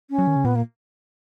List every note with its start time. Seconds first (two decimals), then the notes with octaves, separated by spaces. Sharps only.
0.10 C#4
0.18 F#3
0.27 D#3
0.36 C#3
0.44 A#2 B3
0.55 A#3